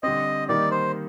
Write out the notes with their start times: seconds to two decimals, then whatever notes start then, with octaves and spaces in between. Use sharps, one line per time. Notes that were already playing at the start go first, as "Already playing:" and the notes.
0.03 D3 G3 C4 D#5
0.49 D#3 G3 A#3 D#4 G4 D5
0.71 C5